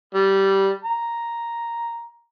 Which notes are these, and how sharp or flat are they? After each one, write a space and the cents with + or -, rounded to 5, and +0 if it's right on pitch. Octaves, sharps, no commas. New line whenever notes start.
G3 -10
A#5 +0